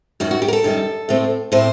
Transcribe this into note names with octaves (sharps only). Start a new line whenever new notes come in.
F#2 D#3 G3 F#4
F#4
G4
A#4
A4
F#2 D#3 G3
A2 A3 C4
A2 A3 C4 C5